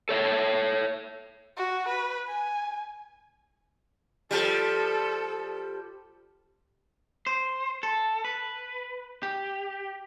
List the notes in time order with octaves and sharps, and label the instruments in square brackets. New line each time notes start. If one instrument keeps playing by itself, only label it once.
[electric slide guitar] A4 C#5 E5 A5
[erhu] F#4
B4
G#5
[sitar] F3 G3 [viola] A4
[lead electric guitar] C5
A4
B4
G4